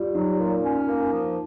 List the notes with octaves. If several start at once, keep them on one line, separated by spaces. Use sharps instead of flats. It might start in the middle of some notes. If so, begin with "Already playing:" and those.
Already playing: G3 F4
F#3 D#4
A#2
C#4
A#3
F3